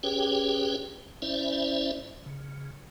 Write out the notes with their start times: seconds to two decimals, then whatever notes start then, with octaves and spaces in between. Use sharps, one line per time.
0.03 C#4 G4 G#4 B4 C#5 G5
1.22 C#4 E4 C5 D5 E5
2.26 C#3